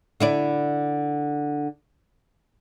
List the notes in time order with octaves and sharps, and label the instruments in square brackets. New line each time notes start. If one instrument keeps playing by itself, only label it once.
[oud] D3 E4 D5